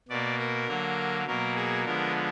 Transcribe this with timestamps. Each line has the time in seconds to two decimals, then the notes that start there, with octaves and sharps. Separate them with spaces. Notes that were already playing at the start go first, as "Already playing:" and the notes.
0.09 B2 A#3 D5
0.39 A#4
0.67 D3 F#3 A#3
1.27 B2 F#3 A#3 A#4
1.55 G#4
1.85 D3 F3 G#3 B3 A#4